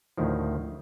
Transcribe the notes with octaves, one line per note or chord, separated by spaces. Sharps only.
D2 A2 D#3 F3